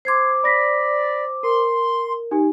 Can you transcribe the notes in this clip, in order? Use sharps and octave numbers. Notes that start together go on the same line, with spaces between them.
C5 C6 D6 G#6 C7
D5 B5 A#6 B6
A#4 C6
D#4 G4 G#5